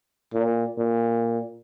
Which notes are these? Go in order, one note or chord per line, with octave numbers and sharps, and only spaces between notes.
A#2
A#2